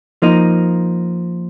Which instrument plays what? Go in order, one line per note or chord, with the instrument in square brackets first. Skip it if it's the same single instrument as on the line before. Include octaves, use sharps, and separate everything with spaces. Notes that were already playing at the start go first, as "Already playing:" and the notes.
[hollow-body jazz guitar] F3 A#3 D#4